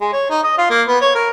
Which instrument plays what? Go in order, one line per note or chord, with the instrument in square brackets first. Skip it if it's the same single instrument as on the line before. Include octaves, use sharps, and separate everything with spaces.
[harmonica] G#3
C#5
D#4
D#5
F4
A#3
B3
C#5
A#4